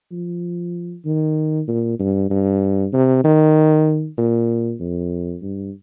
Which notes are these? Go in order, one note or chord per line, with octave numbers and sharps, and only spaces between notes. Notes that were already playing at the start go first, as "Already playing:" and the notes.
F3
D#3
A#2
G2
G2
C3
D#3
A#2
F2
G2